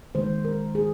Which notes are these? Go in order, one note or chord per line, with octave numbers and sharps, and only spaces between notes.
D#3 G#3 C5
A#4
G#4